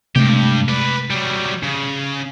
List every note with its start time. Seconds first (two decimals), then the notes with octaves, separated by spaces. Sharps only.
0.16 G2 C3 G#3 A3 G4
0.68 B4 D5
1.10 F#3 G3
1.63 C#3